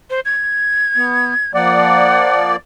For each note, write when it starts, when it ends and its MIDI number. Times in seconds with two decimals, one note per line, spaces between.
0.10 0.20 72
0.25 1.54 92
0.97 1.34 59
1.54 2.56 53
1.54 2.56 58
1.54 2.56 74
1.54 2.51 78